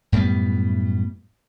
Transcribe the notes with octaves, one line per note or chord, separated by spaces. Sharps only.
F#2 A2 G3 B3